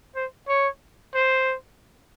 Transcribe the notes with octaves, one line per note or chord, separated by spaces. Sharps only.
C5
C#5
C5